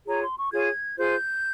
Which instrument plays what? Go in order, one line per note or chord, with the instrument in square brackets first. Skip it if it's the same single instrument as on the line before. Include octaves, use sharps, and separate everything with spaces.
[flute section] F4 G#4 C#5 A#5
C6
C#6
F4 G#4 C#5 G#6
F4 G#4 C5 G6